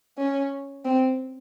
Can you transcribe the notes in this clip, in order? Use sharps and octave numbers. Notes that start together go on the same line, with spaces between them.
C#4
C4